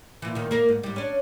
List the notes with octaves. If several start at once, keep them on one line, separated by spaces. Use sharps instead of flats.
A#2 E3
A#2 D#3
A#3 A#4 F5
G#2
G#2 G3
C#4 D4